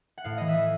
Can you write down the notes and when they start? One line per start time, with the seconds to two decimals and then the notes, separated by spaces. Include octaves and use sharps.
0.18 F#5
0.24 A2 F5
0.38 E3 D#5
0.48 E5
0.55 E3